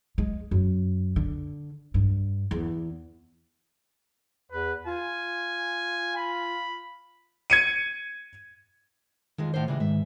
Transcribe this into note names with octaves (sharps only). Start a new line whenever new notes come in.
G#3
F#2
D3
G2
E2
E2 B4
F4 G#5
B5
G#6 C#7 D#7
F2 D#3 G#3 F4
A2 D3 C5
C#3 E3 G3 G#3
G#2 D#3 E5